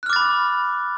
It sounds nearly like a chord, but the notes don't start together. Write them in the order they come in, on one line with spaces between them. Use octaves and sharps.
F#6 F6 D6 A6 B5